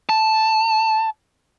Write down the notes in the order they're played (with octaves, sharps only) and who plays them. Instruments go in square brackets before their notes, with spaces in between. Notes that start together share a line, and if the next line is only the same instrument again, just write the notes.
[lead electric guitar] A5